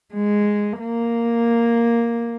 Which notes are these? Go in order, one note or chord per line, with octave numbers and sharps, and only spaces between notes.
G#3
A#3